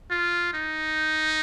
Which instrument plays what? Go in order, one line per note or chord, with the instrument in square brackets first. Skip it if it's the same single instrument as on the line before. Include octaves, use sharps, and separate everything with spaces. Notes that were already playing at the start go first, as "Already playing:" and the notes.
[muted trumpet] F4
D#4